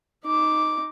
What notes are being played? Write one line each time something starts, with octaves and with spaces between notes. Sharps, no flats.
D#4 D6